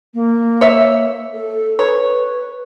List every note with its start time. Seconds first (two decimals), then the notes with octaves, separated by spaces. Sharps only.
0.14 A#3
0.61 C#5 E5
1.33 A4
1.79 B4 C#5